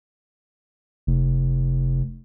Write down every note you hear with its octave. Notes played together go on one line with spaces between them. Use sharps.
F1